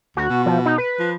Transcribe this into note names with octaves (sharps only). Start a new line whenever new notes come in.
D2 F#4
B2
F3
D#4
B4
F3